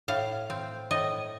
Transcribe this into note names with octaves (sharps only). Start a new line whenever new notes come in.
A2 F5
C4
A2 D#5